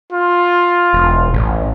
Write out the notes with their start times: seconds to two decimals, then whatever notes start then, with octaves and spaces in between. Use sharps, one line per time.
0.12 F4
0.93 E1
1.34 A1